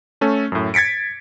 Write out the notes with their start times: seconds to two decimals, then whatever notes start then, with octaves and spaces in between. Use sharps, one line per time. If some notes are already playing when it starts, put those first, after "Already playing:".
0.21 A3 C#4 A4
0.52 F#2 A2
0.74 G#6 A6 B6 C#7 D7